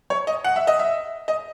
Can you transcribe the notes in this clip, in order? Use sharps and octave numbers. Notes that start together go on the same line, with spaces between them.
C#5
D#5
F#5
E5
D#5
E5
D#5